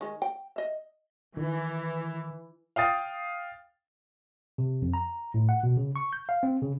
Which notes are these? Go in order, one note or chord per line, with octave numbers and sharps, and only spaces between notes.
D#3 G#3
G5
D#5 E5
D#3 E3
F5 G5 D#6 A6
C3
F2
A#5
A2
F#5
B2
C#3
C#6
G6
F5
C4
C#3